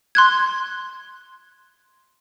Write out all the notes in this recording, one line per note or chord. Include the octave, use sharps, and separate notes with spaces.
C6 F#6 G#6